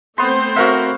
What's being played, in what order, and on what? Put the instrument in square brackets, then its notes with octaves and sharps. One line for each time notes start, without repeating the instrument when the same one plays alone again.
[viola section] A3 C4 C5 [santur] B3 C6
[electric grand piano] F#4 A#4 E5 [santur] C#5 F5